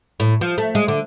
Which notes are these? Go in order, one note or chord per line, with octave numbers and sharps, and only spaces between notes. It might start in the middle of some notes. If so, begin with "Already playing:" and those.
A2
F3
A3
G#3
D3